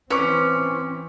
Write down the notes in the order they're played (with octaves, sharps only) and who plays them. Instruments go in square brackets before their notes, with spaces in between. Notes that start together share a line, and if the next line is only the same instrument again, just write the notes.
[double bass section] E3 C4 [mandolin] C#4 [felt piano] B4 D6